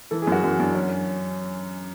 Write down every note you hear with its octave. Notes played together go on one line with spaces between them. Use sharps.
E3 A4
G#4
F#2 F#4
F#2
F#2 D4
C#4